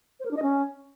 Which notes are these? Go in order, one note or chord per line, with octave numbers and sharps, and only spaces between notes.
C5
A#4
D4
D#5
C#4